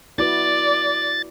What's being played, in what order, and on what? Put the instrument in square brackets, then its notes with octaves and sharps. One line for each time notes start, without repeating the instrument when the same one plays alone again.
[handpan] E4 F#4 B4 [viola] D5 [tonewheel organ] A6